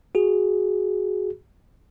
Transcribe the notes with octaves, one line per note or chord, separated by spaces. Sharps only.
F#4 G#4